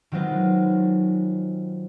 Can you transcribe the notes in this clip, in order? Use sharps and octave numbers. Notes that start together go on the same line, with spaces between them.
D#3 F#3 G#3 C4 F4 B4